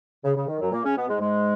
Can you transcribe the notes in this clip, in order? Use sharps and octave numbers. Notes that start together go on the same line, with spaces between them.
C#3
C#3
D#3
F#2 F#3
A#2 A#3
C#3 C#4
B2 B3
G#2 G#3
G#2 G#3